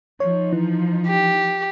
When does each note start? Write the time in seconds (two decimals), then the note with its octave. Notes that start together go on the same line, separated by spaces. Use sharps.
0.20 F3 D#4 C#5
0.53 E3
1.08 G4